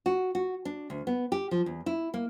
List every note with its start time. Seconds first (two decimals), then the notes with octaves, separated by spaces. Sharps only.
0.06 F#4
0.35 F#4
0.65 D4
0.90 D2
1.07 B3
1.32 G4
1.51 F3
1.66 E2
1.86 E4
2.14 A#3